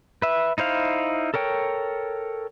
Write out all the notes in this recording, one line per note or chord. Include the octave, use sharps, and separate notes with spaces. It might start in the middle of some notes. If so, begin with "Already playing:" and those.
B4 E5
D#4 E4 C5 F5
A4 A#4 C#5 G5